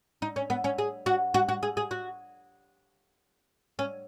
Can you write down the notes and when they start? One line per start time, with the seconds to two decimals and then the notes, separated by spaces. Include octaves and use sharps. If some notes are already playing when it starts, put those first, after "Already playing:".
0.22 D#4
0.36 C#4
0.50 B3
0.64 C#4
0.78 G#4
1.06 F#4
1.34 F#4
1.49 F#4
1.63 G#4
1.77 G#4
1.91 F#4
3.79 C#4